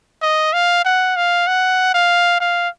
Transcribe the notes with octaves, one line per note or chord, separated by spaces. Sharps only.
D#5
F5
F#5
F5
F#5
F5
F5